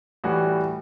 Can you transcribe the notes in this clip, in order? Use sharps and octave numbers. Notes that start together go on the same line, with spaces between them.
A2 E3 G3 F#4